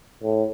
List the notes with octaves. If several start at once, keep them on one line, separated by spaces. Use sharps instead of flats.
A2